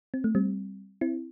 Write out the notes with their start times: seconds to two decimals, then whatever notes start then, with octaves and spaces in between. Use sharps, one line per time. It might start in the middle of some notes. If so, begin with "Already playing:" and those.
0.14 C4
0.24 A3
0.35 G3 C4
1.01 C4 E4